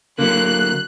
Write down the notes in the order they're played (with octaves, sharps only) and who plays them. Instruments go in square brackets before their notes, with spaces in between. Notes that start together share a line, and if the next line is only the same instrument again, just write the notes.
[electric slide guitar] D3 F#3 [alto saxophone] A#3 [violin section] F#6